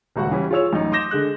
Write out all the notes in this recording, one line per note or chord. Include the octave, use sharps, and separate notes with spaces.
D#1 C#2 F#4 E5 F#5
E3 G3 C#4
F4 G#4 C#5 E6 F7
A1 F#2 D#4
C6 D6 D#6 G6 A#6 E7
D3 G#3 F#6